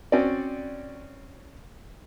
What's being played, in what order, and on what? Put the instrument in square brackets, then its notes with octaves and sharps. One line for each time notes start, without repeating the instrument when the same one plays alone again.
[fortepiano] C4 C#4 F#4 D5